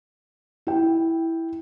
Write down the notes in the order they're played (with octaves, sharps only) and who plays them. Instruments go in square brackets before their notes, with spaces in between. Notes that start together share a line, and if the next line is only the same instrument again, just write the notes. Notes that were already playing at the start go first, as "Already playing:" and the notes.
[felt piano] E4 G5